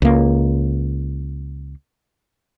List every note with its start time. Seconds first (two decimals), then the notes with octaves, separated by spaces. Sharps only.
0.02 C#2 A#3